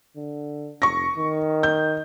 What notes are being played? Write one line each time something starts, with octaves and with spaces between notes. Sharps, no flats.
D3
F1 C#6 A#6
D#3
G6